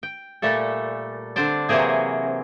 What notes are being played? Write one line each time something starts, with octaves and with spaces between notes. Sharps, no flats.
G5
A#2 G3 A3 A4
D3 C4 D4 C5 D5
C3 E3 F#3 A#3 C4 G#4